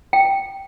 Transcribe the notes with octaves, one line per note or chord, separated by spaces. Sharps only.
G5